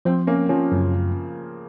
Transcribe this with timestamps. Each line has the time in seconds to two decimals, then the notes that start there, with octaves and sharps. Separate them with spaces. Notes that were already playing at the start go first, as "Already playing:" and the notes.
0.05 F3 C4
0.27 A#3 C#4
0.49 F3 C#4
0.72 F#2 C#3